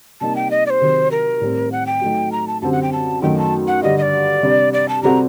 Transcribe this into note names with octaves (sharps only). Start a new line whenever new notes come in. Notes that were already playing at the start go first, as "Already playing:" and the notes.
C3 G3 A#3 D#4 A5
G5
D#5
D5
C5
C3 D#3 F#3
A#4
A2 G3 C4
F#5
G5
F#3 A3 D#4
A#5
A5
F#2 D3 G3 C4 G4 A5
F#5
G5
A5
F#2 D#3 F#3 A3 D#4 G5
A5
F#5
G2 D3 G3 D#5
D#5
D5
C3 G3 D4
D5
A5
C3 G3 C4 F#4 A4 A#5